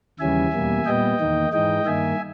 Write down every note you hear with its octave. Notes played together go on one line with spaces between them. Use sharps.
D#2 C#3 E3 G3 C#4 E5 G#5
E2 B2 G3 A#3
A#2 G3 B3 D#5 G5
E2 D#3 A#3 D#4
G#2 E3 G#3 D#4 D#5 G5
G2 D#3 A#3 E5 G#5